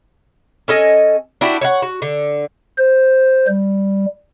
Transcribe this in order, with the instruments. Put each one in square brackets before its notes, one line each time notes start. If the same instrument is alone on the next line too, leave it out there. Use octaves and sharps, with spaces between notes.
[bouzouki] C#4 A4 D#5 G#5
D4 E4 F#4 G4
C#5 E5 F#5
F#4
D3
[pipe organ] C5
G3